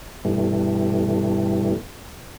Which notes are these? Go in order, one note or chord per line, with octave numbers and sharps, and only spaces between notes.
G2 B2 E3 G3 A3